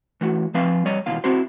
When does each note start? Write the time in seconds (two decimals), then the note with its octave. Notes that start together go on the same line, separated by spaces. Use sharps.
0.21 E3 A3 F#4
0.54 F3 C4 B4 E5 F5
0.85 G3 C#5 D#5
1.06 D#2 B2 E3 F4 F5
1.24 C4 E4 F#4 C5